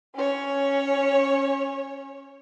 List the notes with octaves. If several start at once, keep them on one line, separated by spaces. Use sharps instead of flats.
C#4 C#5